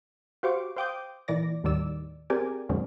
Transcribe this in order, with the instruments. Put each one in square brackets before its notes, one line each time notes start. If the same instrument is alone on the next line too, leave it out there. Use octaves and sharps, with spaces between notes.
[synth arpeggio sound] F#4 G4 C5 F5 C#6 D6
C5 F5 G5 D6 D#6 G6
A#2 E3 D5 A#6
D#2 A2 D#3 G3 D5 E6
C4 G4 G#4 A#4 D5 G#5
F2 A#2 D3 F#3 G#3 C4